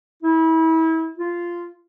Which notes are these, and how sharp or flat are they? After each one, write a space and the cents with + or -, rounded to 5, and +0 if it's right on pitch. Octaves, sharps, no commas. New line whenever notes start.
E4 -30
F4 -10